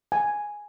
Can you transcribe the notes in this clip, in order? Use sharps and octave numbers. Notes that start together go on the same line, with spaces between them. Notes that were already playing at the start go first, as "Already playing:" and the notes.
G#5